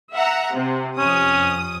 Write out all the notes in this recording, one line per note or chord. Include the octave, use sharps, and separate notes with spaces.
E5 F#5 A#5
C3
F2 C#4 D#6